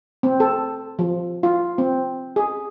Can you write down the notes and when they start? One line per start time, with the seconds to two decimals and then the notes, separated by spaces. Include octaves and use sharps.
0.23 C4
0.40 A4
0.99 F3
1.43 F4
1.78 C4
2.36 G#4